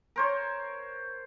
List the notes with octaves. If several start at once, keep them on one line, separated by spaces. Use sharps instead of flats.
A#4 C5 C#5